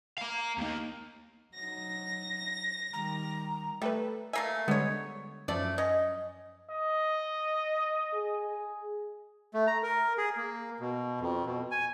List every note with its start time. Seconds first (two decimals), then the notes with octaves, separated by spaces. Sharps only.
0.18 F5 A#5
0.58 D#2 A#3
1.54 F#3 D#4 A#6
2.93 D#3 G3 A#5
3.82 G3 A3 A4 B4
4.33 A3 A#3 E5 G#5
4.68 D3 G3 G#3 B3 C#5
5.48 F#2 F3 A3 D5
5.78 C#4 D#5
6.70 D#5
8.14 G#4
9.54 A3
9.67 A#5
9.83 A#4
10.18 G#4
10.37 A#3
10.80 B2
11.20 F2
11.46 B2
11.71 G#5